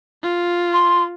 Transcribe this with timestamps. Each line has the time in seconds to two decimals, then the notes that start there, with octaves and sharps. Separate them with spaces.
0.23 F4
0.73 C6